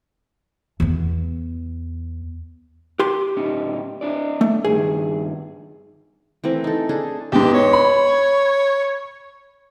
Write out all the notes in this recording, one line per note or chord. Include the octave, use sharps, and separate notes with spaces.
E2 B3
G4 C6
A2 C#4 D#4
D4 E4 D5
A3
G2 D#3 G#4
E3 A3 C4 A#4
D#4 A4
D4 G#4 A4
E2 G#2 G4
C#5
B5